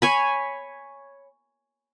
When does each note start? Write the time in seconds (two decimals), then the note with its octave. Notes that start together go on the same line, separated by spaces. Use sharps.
0.02 C#5 G#5 B5